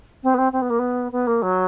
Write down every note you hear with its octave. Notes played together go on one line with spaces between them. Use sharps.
C4
B3
C4
C4
B3
A#3
B3
B3
A#3
F#3